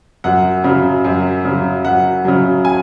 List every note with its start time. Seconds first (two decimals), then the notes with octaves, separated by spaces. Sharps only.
0.24 F#2 F#5
0.64 C#3 F#3
1.05 F#2
1.45 C#3 F#3
1.84 F#2 F#5
2.25 C#3 F#3
2.65 G#5